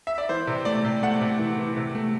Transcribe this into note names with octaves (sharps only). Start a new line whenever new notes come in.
E5
D5
E3 C5
C3
A3 D5
C3
A3 F#5
C3
E3
E3
C3
A3